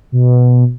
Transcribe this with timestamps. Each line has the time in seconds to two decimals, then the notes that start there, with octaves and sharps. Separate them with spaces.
0.12 B2